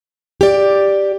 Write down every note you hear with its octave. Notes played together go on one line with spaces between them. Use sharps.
G4 D5